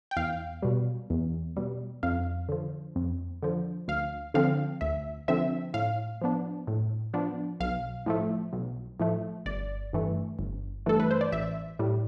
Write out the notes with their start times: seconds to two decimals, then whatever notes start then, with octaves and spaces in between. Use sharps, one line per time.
0.11 G5
0.17 E2 F5
0.62 B2 G3
1.10 E2
1.57 B2 G3
2.03 F2 F5
2.49 D3 F3
2.96 F2
3.43 D3 F3
3.88 D2 F5
4.34 D3 F3 C4 F5
4.81 D2 E5
5.28 D3 F3 C4 E5
5.74 A2 F5
6.21 F3 B3 D4
6.67 A2
7.14 F3 B3 D4
7.60 B1 F5
8.06 A2 F3 A3
8.53 B1
9.00 A2 F3 A3
9.46 G1 D5
9.93 G2 E3 A3
10.39 G1
10.86 G2 E3 A3 A4
11.00 B4
11.11 C5
11.21 D5
11.32 A1 E5
11.79 A2 G3